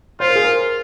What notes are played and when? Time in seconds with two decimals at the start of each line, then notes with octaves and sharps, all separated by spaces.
0.20 F4 C5
0.28 A#4
0.36 G#4
0.43 A#4